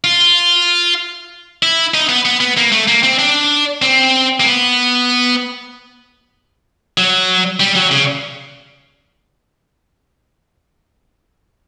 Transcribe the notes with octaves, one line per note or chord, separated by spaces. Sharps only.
F4
E4
D#4
B3
B3
B3
A#3
A3
A#3
C4
D4
C4
A#3
B3
F#3
G3
F#3
C#3